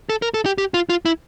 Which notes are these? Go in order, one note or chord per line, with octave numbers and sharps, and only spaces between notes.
A4
A#4
A4
G4
G4
F4
F4
E4